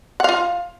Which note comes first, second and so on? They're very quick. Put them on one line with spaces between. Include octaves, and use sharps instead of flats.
F#5 F5 F4